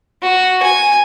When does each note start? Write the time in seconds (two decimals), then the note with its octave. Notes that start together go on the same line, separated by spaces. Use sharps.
0.22 F#4
0.63 G#5